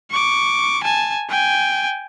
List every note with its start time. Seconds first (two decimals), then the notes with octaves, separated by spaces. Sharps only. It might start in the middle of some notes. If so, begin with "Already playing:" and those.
0.11 C#6 D6
0.84 G#5 A5
1.29 G5 G#5